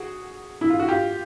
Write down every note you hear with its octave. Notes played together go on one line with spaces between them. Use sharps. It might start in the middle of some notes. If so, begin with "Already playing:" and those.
Already playing: F#4 G#4
E4
F4
F#4
F4 G4